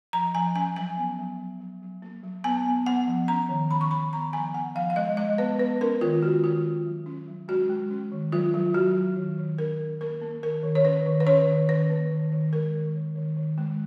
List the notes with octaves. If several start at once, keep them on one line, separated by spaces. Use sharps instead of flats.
F3 A#5
F3 G#5
C#4 G#5
F#3 G#5
B3
F#3
F#3
F#3
F#3
A#3
F#3
B3 G#5
B3
B3 F#5
F3
C#4 A#5
D#3
D#3 B5
C#6
D#3 B5
B3 A#5
F3 G#5
B3 F#5
F3 F5
F5
G#3 D#5
G#3 D#5
B3 B4
B3 B4
C#4 A#4
D#3 F4
G#3 F#4
D#3 F4
C#4
F#3
C#4
F#3
G#3 F#4
G#3
C#4
D#3
F#3 F4
F#3
F#3 F#4
F#3
D#3
D#3
C#4 A#4
C#4
A#3 A#4
A#3
D#3 A#4
D#3
C#5
C#4 B4
D#3
B4
C#4 C#5
D#3
D#3 B4
A#3
D#3
D#3
G#3 A#4
D#3
D#3
D#3
D#3
G#3